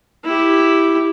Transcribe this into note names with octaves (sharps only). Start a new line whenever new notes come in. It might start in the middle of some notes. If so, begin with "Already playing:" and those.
E4 G4